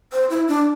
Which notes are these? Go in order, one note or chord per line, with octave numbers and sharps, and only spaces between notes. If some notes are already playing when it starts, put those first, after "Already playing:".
C5
E4
D4